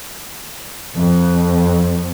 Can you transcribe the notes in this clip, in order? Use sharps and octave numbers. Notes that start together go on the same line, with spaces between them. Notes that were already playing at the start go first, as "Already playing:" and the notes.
F2